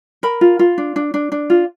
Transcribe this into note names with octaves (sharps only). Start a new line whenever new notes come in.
A#4 B5
F4
F4
D4
D4
D4
D4
F4